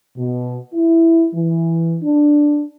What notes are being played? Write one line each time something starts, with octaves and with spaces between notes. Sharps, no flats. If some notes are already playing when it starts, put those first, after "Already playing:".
B2
E4
E3
D4